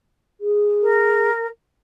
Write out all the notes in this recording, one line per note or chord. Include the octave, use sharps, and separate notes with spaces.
G#4
A#4